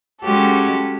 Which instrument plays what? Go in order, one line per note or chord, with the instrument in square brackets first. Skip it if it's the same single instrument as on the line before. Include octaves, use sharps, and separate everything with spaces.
[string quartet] G#3 C#4 F#4 G4 A4